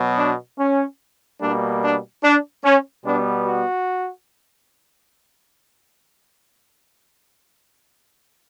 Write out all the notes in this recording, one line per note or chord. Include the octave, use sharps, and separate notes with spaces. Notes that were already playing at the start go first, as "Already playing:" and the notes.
Already playing: B2 F#3 B3
D4
C#4
B2 G3 A#3 D4
D4
D4
C#4
B2 G3 B3 D4
F#4